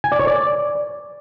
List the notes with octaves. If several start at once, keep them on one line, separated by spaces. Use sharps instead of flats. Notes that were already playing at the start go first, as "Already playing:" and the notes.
G#5
D5
C#5
D5